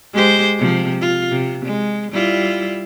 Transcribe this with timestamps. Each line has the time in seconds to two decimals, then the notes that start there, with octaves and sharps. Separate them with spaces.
0.13 G#3 G4 C5
0.59 C3 F3
1.01 F4
1.31 C3
1.65 G#3
2.11 G3 E4 F4